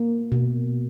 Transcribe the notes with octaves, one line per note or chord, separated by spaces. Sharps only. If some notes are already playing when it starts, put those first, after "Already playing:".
Already playing: A#3
B2